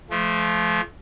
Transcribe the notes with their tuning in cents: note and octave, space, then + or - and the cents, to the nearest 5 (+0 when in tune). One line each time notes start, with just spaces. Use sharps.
F3 -25 A3 -40